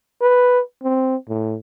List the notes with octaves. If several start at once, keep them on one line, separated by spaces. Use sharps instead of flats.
B4
C4
A2